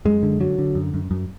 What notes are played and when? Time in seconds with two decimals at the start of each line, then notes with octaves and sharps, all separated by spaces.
0.05 F#2 G#3
0.23 D3
0.40 D3 F#3
0.59 D3
0.75 F#2
0.94 F#2
1.11 F#2